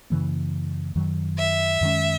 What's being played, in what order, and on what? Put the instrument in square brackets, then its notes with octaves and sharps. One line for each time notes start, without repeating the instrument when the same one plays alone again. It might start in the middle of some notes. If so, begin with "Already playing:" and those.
[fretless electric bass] F#2 C#3 E3 A#3
F#2 D#3 F#3
[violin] E5
[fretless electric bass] F#2 D#3 G#3 C#4